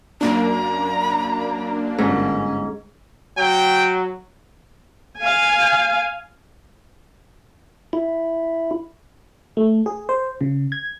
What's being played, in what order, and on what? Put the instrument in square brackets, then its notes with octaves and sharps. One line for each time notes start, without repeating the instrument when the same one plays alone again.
[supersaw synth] F#2 A#3 D4 [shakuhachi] A#5
[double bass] G1 C#4 [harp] G#2
[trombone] F#3 [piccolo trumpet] G5
[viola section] F5 G#5
[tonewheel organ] E4
[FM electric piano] A3
G#4
C5
C#3
G#6